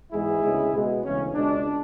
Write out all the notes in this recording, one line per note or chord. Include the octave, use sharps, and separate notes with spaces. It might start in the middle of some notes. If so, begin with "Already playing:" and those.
G#2 E3 G#3 B3 E4 G#4
D2 C#3 G#3 B3
B2 G#3 B3
D2 C#3 E3 C#4
C#2 B2 G#3 D4